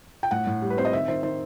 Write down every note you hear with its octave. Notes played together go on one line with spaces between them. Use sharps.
G5
A2 F#5
A2
G3
B4
C4 C5
D#5
D#3 E5
D#3 C5
D#3 C5